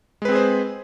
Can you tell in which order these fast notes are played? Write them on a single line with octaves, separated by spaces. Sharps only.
G#3 B4 C4 G#4 C5